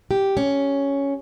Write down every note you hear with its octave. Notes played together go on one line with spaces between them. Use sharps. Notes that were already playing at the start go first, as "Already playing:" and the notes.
G4
C#4